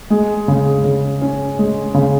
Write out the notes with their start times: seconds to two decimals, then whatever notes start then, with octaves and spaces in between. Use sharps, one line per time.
0.10 G#3
0.48 C#3
0.84 C#3
1.21 C#4
1.59 G#3
1.94 C#3